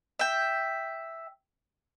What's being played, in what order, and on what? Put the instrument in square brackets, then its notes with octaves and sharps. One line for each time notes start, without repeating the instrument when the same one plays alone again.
[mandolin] E5 G5